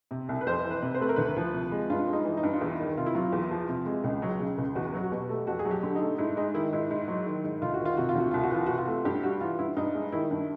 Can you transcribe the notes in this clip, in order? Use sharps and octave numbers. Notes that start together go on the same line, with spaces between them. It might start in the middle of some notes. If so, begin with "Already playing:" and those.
C3
C2
B4
F2 C5
E3
B4
C3
C5
A3 B4
A#4
D2 B4
F3
C3
G#3
G2 F4
G#3
D#4
E3
D#4
G2
F4
E2 E4
D#3
C3 F4
E4
F#3 F4
E2
F3
C3
G#3
C#2
F#3
C#3
C#2
E2 F#4
F#3
F#4
B2 G4
A3
F2 F#4
G#4
F#3
G4
D3
D#4
A3
G#2 E4
G#3 D#4
D#3 E4
G#2 E4
G#2
F#3
D#3
G#2
D2 F4
F#4
D#3
F4
C3 F#4
F4
D2 F#4
C2 F4
F#4
E3 F4
C3 F#4
F4
A3
G2 G4
G3 F#4
E3 F4
G2 E4
G2 D#4
G#3
D#3 E4
G2